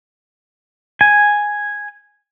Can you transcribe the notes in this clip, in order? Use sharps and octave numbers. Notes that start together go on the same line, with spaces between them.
G#5